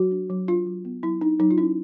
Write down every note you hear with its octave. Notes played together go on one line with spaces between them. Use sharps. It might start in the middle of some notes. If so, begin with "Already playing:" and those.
Already playing: F#3 F#4
D4
F#3
D4 F4
F#3
B3
F#3 E4
D4 D#4
F#3 D#4
F4
C#4 E4